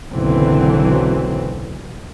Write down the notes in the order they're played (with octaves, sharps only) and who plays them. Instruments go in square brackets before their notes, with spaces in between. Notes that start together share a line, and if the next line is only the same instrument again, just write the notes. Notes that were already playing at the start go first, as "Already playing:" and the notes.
[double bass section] F#1 B1 D3 E3 F#3 C4